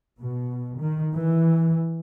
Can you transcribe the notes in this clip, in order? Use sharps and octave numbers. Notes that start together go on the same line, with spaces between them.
B2
D#3
E3